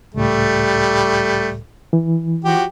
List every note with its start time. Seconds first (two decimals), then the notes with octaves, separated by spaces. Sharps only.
0.14 C#2 A2 G3 A3
1.93 E3
2.44 F3 F#4 G4